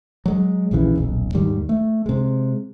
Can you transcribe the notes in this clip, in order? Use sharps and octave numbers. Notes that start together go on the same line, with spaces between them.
F#3 G#3
A#1 D#2 C#3 E3
D#1 B1
D#2 G#2 D#3 G3
A3
C3 G#3